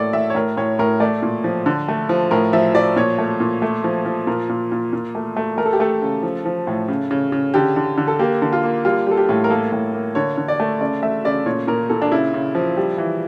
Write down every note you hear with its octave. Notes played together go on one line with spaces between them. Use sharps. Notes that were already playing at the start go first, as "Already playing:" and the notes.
Already playing: A2 A#3 A4 D5
A2 E5
C#5
A2 A#4
A2 C#5
A2 A#4
A3 D5
A#2
F3
D3
A3
F3
A2 A#4
F3 E5
F3 D5
A#2 C#5
A3
A#2
A3
F3
F3
A#2 A#4
A#2
A#2
A#2
A3
A3
A3 A#4
A4
G4
A3 A4
C#3
F3
F3
A2
C#3
C#3
C#3
D3 G4
D3
D3
A4
A#3 G4
D3
F4
A#3
G3 F4
G3 A4
G4
A2
A#4
A#3 A4
A2
A#3
D3 C#5
D3
D5
A3
C#3 D5
A3 E5
C#3 D5
A#2 C#5
A#2 A#4
A#2 A4
D4
C#3 E4
C#3
F3
G3
E3